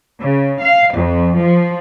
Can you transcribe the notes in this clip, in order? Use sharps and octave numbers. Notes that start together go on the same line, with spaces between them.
C#3
F5
F2
F3